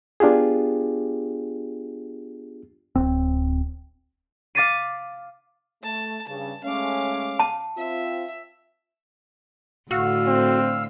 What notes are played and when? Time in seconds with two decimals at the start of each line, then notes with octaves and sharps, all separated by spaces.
0.20 B3 D4 F4 G4 G#4
2.96 D1 C4
4.55 F5 D6 A6 B6 C7 D#7
5.83 A3 A5
6.27 G2 C#3 A5
6.64 G#3 A3 C#4 F5 D6
7.40 A5
7.77 C4 F4 E5
9.91 A2 D3 F#4 F5 E6
10.27 C4